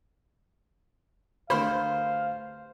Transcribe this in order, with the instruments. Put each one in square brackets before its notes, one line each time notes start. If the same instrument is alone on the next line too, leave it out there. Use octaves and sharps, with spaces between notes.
[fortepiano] D2 A#4 B5 [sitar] C5 [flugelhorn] F5